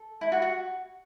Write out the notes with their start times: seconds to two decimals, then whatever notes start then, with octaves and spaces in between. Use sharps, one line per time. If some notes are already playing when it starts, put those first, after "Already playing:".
Already playing: A4
0.21 E4
0.32 F#4
0.42 F#4